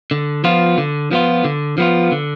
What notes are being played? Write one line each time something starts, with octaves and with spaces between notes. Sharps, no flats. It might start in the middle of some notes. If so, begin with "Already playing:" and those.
D3
F3 B3 F4
D3
F3 B3 F4
D3
F3 B3 F4
D3